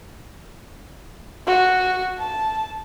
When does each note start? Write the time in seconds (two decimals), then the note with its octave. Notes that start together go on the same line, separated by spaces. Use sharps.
1.47 F#4
2.19 A5